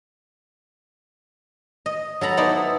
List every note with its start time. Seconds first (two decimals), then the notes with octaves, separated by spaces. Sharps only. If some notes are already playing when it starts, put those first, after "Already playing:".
1.86 D#5
2.21 F#3 A4 A#5 B5
2.37 B3 D#4 E4 C5 D5